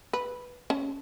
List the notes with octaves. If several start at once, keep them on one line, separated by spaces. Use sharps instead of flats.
B4
C#4 A5